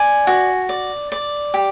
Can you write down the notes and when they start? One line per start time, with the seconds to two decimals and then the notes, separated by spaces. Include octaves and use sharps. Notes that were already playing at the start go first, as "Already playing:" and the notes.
Already playing: D5 G#5
0.27 F#4
0.69 D5
1.12 D5
1.54 G4